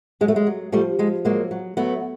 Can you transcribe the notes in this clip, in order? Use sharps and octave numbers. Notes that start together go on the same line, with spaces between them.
F#3 G#3
A3
G#3
F#3
F3 G3 A3
F3 G#3
F#3 G#3 A#3
F#3
F#3 A3 B3